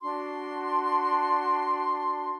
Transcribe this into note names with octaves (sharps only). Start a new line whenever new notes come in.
D4 F#4 C6